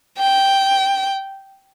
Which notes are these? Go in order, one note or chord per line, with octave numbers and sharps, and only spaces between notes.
G5